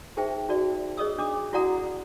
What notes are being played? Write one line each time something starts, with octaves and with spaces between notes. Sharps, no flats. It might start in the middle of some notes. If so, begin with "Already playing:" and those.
D#4 G4 G#4 C5 E5 G5
D#4 F#4 D5
G#4 C#5 D#5 D#6 E6
D4 D6 D#6
E4 F#4 D5 F#5 A#5 D#6